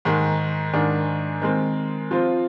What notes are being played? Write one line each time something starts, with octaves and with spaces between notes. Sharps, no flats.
G#2 D#3 G#3
G#2 D#3 G#3 D4
D#3 G#3 C4
F3 C4 F4 C5